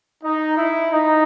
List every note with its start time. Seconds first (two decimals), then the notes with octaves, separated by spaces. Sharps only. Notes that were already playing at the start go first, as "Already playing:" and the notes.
0.24 D#4
0.58 E4
0.92 D#4